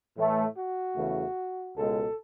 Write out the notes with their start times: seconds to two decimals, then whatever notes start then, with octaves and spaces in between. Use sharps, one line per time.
0.17 A2 E3 A3
0.56 F#4
0.96 E2 C#3 E3 A3
1.77 C#2 B2 G#3 A4